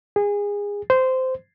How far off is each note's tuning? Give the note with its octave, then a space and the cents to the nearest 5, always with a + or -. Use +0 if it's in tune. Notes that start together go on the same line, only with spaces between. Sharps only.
G#4 -25
C5 -15